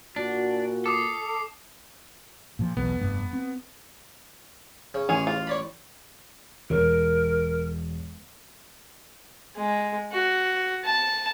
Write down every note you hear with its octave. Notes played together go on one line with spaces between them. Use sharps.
A#2 D4 F#4
A4 D6 D#6 C7
A#2 F3
B1 E2 B2 B3
F1 G2
C4
C#3
A1 C#4 G#4
F4
C#5 D5 B5
E1 A#4 C#5
G#3
F#4
A5